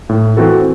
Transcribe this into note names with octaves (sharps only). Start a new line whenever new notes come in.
A2
E3 C4 F#4 A4